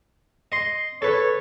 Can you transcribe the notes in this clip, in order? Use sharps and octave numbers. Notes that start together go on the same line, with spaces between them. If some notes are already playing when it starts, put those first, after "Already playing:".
D#5 C6
A4 B4 C#5